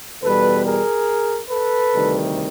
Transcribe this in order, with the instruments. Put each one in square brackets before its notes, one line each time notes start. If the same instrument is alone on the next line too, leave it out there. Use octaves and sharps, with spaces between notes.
[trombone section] E2 B2 G3 A4 B4
G#4 A#4
A4 B4
D2 C3 D#3 G3